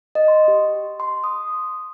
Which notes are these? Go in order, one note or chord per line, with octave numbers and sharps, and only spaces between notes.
D#5
C6
G4
C6
D#6